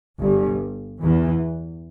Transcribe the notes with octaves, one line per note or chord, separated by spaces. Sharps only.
G1 G2
E2 E3